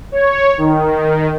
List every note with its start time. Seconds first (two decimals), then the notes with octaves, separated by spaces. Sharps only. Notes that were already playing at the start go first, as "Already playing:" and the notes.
0.12 C#5
0.58 D#3